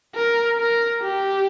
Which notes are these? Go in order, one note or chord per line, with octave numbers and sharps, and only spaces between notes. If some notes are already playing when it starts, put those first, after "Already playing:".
A#4
A#4
G4